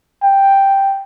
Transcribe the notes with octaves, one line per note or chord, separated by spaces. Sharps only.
G5